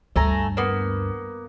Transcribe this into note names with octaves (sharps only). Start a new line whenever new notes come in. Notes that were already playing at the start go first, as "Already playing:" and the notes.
D2 G2 A3 G#5 A#5
A#3 B3